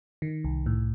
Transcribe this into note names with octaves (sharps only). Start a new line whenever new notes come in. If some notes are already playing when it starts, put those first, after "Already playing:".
D#3
C2
A2